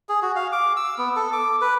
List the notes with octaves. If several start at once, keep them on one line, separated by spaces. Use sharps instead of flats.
G#4
F#4
F5
D6
E6
B3
A4
D6
B4